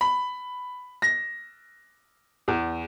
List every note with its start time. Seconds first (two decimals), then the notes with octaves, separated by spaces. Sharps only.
0.01 B5
1.02 A#6
2.48 E2